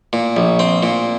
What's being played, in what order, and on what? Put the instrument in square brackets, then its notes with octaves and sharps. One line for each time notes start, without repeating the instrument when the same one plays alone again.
[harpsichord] A#2
A#1
C4
A#2